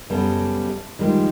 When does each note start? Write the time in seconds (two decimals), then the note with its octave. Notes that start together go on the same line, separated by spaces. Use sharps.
0.10 F#2 C#3 G3 B3 C#4 A4
0.99 D#3 F3 G3 G#3 A#3